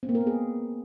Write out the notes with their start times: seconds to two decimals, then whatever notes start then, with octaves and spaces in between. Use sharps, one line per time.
0.03 C4
0.09 A#3
0.15 A#4
0.21 B3
0.27 G#4